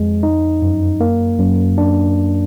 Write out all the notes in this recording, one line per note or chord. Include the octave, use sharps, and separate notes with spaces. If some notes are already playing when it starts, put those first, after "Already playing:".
Already playing: F2 G#3
D#4
F#2
A#3
F#2
D4